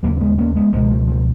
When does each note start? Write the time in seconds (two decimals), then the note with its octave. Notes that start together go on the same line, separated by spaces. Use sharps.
0.03 D#2 C#3 F#3 A#3
0.17 C#4
0.20 G#3 B3
0.38 A#3 C#4
0.55 G#3 B3
0.73 C#2 B2 F3 G#3
0.83 D#3
0.91 F3
1.07 F3